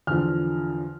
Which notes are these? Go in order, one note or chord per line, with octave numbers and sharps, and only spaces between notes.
E2 D3 F3 F6